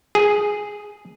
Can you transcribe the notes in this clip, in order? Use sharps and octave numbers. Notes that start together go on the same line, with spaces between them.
G#4